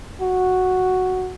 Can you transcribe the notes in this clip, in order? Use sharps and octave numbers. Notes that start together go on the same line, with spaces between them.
F#4